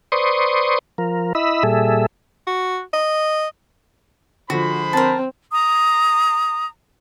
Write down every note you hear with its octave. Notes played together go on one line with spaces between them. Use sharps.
B4 C5 D5 C6 C#6 D#6
F3 A#4
E4 D#5 B5 E6
A#2 G3 G#4 A4 E5
F#4
D#5
D3 F3 G#3 F#4 C5 B5
C4 A#4 A5
A#5 D#6